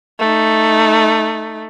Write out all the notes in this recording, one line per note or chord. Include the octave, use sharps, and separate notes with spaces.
A3 D#4